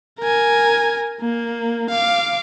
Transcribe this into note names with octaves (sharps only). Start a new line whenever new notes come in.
A#4 G#5
A#3
F5 D6